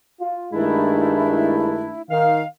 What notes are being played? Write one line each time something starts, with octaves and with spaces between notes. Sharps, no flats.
F4
G2 D#3 G#3 A3 D4 E4
D#3 F5